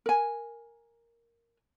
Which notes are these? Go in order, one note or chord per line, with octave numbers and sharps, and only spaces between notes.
A#4 G#5